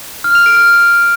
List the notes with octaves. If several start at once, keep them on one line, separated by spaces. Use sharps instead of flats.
F6
F7
D7
F6